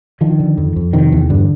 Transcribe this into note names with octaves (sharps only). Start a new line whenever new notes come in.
D3 D#3 F3
D3
F2
F2
C3 D#3
E2
G2 D3